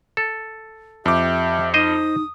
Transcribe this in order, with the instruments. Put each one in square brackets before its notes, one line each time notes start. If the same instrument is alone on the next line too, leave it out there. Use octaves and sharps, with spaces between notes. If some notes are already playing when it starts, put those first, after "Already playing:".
[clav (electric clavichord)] A4
[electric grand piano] F2 D6 [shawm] G4 [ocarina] E5
[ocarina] D#4 [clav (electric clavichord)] C5 D#5 [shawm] D#6